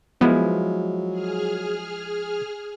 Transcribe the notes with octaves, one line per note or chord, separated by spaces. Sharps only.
F3 F#3 G#3 B3 E4
G#4 F6